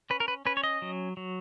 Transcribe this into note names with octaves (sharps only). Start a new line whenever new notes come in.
C#4 B4
A#4
B4
C#4 B4
C#5
D#5
F#3
F#3